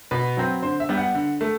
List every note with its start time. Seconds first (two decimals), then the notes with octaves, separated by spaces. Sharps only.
0.11 B2 B4
0.37 F#3 C4
0.62 D3 C5
0.80 E5
0.89 G3 B3
0.97 F#5
1.15 D3
1.41 A3